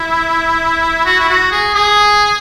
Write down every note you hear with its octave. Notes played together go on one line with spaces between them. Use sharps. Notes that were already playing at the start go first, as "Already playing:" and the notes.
Already playing: E4
F#4
E4
F#4
G#4
G#4